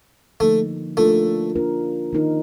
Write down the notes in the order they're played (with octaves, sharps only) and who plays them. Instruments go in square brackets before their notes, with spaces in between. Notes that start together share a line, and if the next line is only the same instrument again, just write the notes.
[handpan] D3 F3 A#3 D#4 [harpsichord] A3
[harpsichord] A3 [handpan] A#3 D4 F4 A#4
[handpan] A#3 D4 F4 A#4
D#3 A#3 D#4 A#4